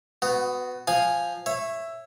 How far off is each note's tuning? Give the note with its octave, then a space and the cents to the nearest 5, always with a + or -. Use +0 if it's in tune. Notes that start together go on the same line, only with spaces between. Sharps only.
B3 +15 F#4 -15
F3 +0 F5 +0 G#5 +0
C#5 -15 E5 +10